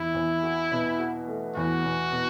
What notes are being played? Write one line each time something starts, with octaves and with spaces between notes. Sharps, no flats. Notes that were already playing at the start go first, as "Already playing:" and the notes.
Already playing: E2 E4
E2
F#4
B2
F#4
A3
E2 F#4
B2
B2